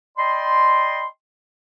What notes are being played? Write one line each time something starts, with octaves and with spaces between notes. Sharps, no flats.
D5 D#5 G5 B5 C6